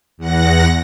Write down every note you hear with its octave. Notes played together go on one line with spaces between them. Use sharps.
E2 F#5 A#6